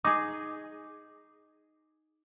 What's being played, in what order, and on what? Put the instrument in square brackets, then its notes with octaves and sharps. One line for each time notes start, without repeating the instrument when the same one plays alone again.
[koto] D#4 G#4 [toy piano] D6 D#6